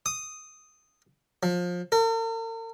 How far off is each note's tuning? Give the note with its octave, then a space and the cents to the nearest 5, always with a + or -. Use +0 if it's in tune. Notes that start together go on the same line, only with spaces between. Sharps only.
D#6 +0
F3 +25
A#4 -45